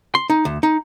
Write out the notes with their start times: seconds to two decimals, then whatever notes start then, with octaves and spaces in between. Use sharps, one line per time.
0.15 C6
0.30 D#4
0.45 D2
0.63 D#4